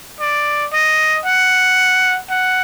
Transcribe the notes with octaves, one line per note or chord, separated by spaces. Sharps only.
D5
D#5
F#5
F#5